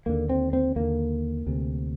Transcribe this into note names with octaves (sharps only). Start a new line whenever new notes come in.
D#2 D3 A#3
C4
C4
D#2 D3 A#3
D2 C3